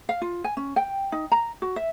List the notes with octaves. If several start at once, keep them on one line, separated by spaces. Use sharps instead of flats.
F5
F4
G#5
C#4
G5
D#4
A#5
F#4
E5